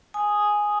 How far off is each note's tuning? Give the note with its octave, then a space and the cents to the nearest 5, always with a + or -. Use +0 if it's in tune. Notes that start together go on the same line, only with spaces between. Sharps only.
G#5 +0 D#6 +0